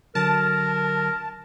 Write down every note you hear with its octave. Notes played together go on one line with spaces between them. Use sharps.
D3 F#3 A#4 A5